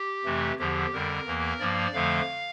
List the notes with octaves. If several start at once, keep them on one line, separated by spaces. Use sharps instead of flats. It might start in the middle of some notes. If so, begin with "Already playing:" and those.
Already playing: G4
F2 C3 E3 A3
E2 D3 F3 G4
F2 D3 G3 A#4
E2 E3 A#3
G2 F3 A#3 D5
F2 D3 F3 A3 F5